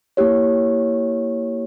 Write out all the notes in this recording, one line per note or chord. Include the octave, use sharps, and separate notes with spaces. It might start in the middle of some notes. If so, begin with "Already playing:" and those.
A#3 E4 G4 C#5